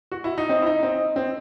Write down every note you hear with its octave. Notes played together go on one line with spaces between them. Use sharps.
F#4
E4
D#4
C4 D#5
E4
D#4
C4 D#5
C4